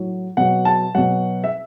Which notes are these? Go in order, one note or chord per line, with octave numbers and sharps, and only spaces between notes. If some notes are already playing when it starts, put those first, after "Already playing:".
Already playing: A2 F#3
B2 F#3 F#5
A5
B2 F#3 F#5
E5